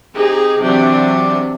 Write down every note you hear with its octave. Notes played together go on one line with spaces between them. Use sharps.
C4 D#4 G4 G#4
C3 E3 F#3 D4